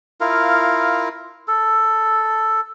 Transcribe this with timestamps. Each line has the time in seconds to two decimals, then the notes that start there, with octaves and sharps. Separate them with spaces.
0.21 E4 F4 A#4 F5
1.48 A4